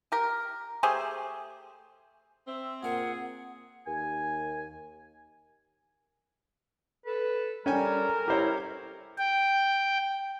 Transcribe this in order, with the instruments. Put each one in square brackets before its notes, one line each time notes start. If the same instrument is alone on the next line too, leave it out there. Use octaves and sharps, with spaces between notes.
[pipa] G4 A#4
A3 G4 G#4 C5
[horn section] C4 [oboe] E5
[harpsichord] A#2 A#4 [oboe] G#4 [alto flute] F#5
[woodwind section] D#2 G#5
[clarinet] A4 [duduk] B4
[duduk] G3 [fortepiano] C#4 G5 G#5 [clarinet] A4 [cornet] A#4
[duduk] E4 [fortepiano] G4 C5 C#5
[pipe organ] G5